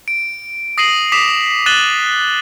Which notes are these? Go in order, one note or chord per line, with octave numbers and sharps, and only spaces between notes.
D7
D#6 A#6 C7 D#7 F#7
D6 D#6 B6 C7 E7 F7
F#6 A6 D#7 E7 F#7 G7